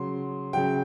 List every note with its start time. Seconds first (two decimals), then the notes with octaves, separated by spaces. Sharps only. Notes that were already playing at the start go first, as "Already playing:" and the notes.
Already playing: C#3 F#3 C6
0.53 C#3 F#3 G5